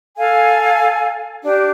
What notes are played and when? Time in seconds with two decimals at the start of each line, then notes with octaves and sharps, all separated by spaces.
0.18 A4 F5 G#5
1.43 D4 G4